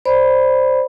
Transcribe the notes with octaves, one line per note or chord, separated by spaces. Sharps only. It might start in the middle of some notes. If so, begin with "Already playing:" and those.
C5 D5 B5